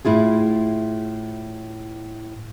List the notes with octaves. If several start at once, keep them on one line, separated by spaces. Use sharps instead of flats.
A2 E4 F4 G#4